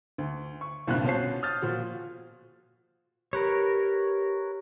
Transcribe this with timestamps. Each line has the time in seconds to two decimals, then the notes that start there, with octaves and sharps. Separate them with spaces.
0.18 D2
0.61 C#6
0.87 C2 G2 A#2 C4 F#6
1.04 B2 C#4 C5 A5 C7
1.43 D#6 F6 G6 A6
1.62 A#2 F3 F#4
3.33 G4 A#4 B4 C#5